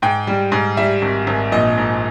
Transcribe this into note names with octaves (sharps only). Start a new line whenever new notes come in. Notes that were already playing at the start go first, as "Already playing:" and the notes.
G#2 G5
G3
G#2
G3 E5
G#1
G#1
A#1 D#5
G#2